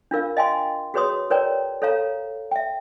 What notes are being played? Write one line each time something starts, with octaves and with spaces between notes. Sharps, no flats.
D4 F4 A#4 F5
D#5 F5 G5 G#5 C6
F#4 G#4 B4 C#5 C6 D#6
A#4 B4 C#5 D5 G5 A#5
A4 C#5 F5 A#5
E5 G5